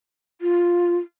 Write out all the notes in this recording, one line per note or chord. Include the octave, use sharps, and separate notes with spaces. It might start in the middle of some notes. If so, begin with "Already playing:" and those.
F4